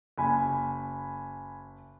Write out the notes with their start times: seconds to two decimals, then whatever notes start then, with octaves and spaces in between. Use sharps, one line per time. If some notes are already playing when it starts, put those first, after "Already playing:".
0.18 F#1 G#5 B5